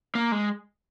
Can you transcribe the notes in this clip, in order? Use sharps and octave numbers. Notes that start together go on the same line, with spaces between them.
A#3
G#3